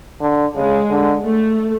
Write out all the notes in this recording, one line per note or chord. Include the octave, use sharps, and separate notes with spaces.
D3
C#3 G#3
D3
A3